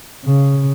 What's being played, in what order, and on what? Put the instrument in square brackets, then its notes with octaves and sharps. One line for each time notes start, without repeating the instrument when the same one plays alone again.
[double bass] C#3